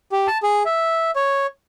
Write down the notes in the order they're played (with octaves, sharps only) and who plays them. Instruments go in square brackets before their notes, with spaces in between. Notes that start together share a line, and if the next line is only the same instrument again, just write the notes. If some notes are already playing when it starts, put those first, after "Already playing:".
[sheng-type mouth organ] G4
A5
G#4
E5
C#5